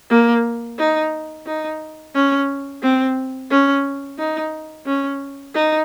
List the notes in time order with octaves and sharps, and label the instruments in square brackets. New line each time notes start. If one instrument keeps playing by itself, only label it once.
[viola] A#3
D#4
D#4
C#4
C4
C#4
D#4
C#4
D#4